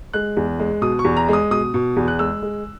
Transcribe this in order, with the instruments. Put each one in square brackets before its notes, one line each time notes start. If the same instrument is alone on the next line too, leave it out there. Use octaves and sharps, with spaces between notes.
[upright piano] G#3 F#6
E2
G#3
B2 D#6
C#6
E2
A#5
G#3 D#6
B2 D#6
B2
E2
F#6
G#3 E6
G#3